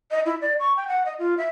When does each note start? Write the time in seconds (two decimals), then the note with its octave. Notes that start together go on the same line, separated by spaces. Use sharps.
0.11 D#5
0.25 E4
0.41 D5
0.59 C#6
0.76 G5
0.87 F#5
1.05 D#5
1.18 F4
1.37 E5